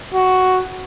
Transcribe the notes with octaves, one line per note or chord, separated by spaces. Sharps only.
F#4